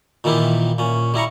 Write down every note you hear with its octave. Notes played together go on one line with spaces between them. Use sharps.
A#2 D#3 E3 E4 F4 G4
A#2 C#4
G3 E4 A#5 C#6